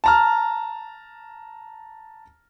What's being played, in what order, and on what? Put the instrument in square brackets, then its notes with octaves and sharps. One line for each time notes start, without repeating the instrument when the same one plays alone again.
[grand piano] A5 A#5 F6